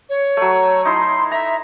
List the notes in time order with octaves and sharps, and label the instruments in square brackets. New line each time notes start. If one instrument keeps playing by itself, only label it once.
[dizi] C#5
[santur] F#3 A3
[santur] D#4 E4 [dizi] C6
[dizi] E5 [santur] A#5